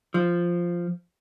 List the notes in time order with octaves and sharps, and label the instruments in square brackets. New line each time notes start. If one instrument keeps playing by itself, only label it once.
[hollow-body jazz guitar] F3